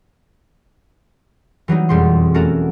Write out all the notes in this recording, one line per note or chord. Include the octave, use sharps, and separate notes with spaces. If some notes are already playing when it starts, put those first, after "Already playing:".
E3 F#3 G3 D#4
E1 F2 G3 G#3 C6
A3 A#3 C#4 F#4 A4 A#4